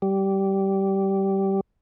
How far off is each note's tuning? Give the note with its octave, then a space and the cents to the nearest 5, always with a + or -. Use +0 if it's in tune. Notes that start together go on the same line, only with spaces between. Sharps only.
G3 -15